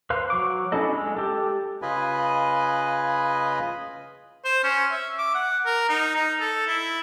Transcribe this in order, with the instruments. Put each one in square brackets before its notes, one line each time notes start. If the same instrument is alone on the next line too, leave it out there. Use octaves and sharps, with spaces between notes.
[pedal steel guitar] B4 C5 F5
F#3 C#6 D6
C#4 D4 E4 A4 D#5
G#3
G4 A4
[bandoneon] C#3 F4 B4 D#5 G#5 B5
[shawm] C5
C#4
E5
D6
F#5
A#4
D#4
D#4
A4
E4